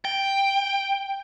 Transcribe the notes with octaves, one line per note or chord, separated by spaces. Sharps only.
G5